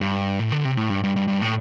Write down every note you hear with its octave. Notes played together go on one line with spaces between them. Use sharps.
G2
A2
D3
C3
A2
G2
G2
G2
G2
A2